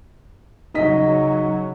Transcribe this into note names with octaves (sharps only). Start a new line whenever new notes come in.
C#3 F#3 D#4 D#5 B6